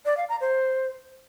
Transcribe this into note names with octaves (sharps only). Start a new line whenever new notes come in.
D5
F5
A#5
C5